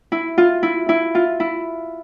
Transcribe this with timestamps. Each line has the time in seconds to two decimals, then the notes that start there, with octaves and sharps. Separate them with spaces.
0.12 E4
0.38 F4
0.63 E4
0.89 E4
1.15 F4
1.40 E4